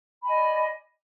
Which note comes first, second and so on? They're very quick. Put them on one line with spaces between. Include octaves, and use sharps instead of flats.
B5 G#5 D#5 D5